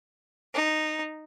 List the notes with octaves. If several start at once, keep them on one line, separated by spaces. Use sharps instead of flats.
D#4